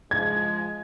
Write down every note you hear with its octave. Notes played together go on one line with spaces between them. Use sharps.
F3 G#3 G#6